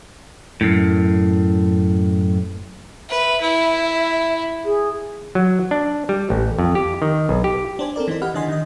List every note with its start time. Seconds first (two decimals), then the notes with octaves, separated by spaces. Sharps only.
0.61 F#2 A2
3.09 B4 E5
3.41 E4
4.64 G#4
5.35 F#3
5.71 D4
6.09 G3
6.30 A1
6.59 F2
6.75 G4
7.02 D#3
7.29 B1
7.44 G4
7.79 D4 C5 G#5
7.96 C4 A4 A#4 D5
8.08 E3 C4 D#4 C5
8.22 G4 D#5 F#5 B5 F6
8.34 D3 E3 D4 D#5 G#5 C6
8.48 D#3 D#5